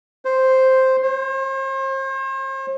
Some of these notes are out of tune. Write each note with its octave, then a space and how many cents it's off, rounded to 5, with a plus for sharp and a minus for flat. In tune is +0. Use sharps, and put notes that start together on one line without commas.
C5 +0
C5 +40